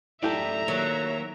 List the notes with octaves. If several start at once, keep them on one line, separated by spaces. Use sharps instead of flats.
F#2 A3 E4 G4 A4 D5 E5 A#5
D#3 F#3 A#3